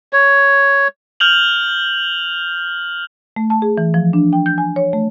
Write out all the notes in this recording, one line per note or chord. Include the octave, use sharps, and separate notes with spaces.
C#5
F6 G6 F7 F#7
A3
A5
G#4
E3
F3
D4
G5
G6
G#5
C#5
A3